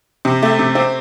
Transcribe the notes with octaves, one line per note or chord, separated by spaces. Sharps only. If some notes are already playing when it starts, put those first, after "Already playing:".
C3
A3
C3
C4